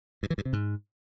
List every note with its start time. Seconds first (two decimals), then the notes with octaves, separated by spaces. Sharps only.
0.23 G2
0.30 E3
0.38 G2
0.45 C3
0.53 G#2